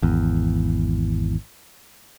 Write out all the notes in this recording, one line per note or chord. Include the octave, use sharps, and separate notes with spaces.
G#1 E2